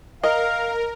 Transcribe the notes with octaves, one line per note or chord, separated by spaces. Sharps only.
A#4 D#5 F5